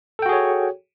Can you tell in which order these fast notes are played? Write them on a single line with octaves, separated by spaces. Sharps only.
A4 G5 F#4 G#4 C#5